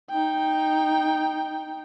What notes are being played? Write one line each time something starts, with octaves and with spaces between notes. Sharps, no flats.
D#4 G5